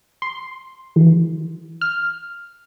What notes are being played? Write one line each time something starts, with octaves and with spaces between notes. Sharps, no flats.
C6
E3
F6